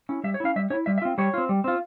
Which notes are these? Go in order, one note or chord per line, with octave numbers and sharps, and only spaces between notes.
C#4 E4
G3 E5
C#5
C#4 E4 F5
G3 E5
C#4 C#5
E4
G3 E5
E5
C4 F4
G3 C#5
C4 F4
G3
C4 F4